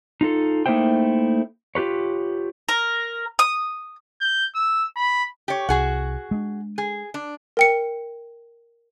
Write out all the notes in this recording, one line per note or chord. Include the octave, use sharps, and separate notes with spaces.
D#4 F4 A4
A3 A#3 D#4 E4 C5 G5
F4 G4 B4 C#5
A#4
D#6
G6
E6
B5
G4 C#5
C2 F#4 G#4 F#5
G#3 D4
G#4
D4
A#4 G5 C#7